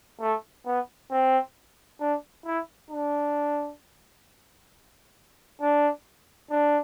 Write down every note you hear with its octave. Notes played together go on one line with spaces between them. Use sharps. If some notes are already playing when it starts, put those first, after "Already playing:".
A3
B3
C4
D4
E4
D4
D4
D4